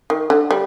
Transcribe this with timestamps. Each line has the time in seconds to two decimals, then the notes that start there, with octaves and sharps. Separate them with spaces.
0.10 D#3
0.30 D3
0.51 G3